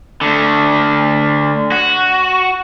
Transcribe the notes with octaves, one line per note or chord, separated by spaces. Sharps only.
D3 A3
F#4